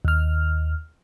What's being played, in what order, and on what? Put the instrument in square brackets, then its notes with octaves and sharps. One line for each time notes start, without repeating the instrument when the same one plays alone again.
[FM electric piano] D#2 F6